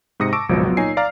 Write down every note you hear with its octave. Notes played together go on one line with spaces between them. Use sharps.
G#2 C3 D#6 A#6 C#7
A5 C#6 D6 E6 A#6 D7
G#1 C#2 B2 F3 F#3
F#3 B3 F4
A#2 D#4 C#5 G#5 C7
D5 F5 A#5 F6